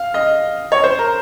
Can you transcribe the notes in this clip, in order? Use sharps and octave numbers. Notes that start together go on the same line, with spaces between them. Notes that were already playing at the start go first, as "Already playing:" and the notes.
Already playing: F5
D#5
C#5
C5
A#4